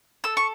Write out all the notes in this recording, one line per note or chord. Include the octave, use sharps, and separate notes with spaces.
A4 E6
C#6